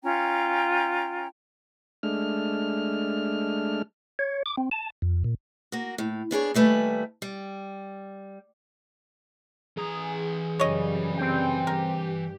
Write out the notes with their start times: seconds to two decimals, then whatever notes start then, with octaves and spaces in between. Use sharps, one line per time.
0.03 C#4 F4 G5 A#5
2.03 G#3 A3 D4 F6
4.19 C#5
4.46 D6
4.58 C4
4.71 A5
5.02 F2
5.24 A#2
5.72 A#3 F#4
5.98 A2
6.31 B3 D4 G#4 C#5
6.54 D#2 G3 A3 B4 G#5
7.22 G3
9.77 E3 G#4 A#5
10.60 F#2 C#3 G3 C#5 D#5
11.18 C4 G5
11.67 G2 G4 A#4